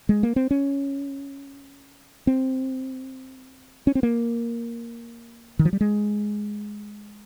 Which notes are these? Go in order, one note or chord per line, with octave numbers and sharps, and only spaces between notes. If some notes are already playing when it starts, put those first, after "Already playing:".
G#3
A#3
C4
C#4
C4
C#4
C4
A#3
D#3
F3
G3
G#3